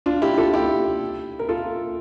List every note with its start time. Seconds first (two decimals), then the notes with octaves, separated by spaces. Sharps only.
0.06 D4 F4
0.22 E4 G4
0.38 F4 A4
0.54 E4 G4
1.39 A#4
1.49 F4 A4